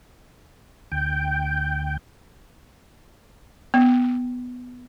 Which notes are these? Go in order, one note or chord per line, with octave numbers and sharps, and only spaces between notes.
D2 G5
B3